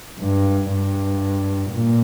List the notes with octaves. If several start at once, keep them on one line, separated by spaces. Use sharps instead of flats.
G2
G2
A#2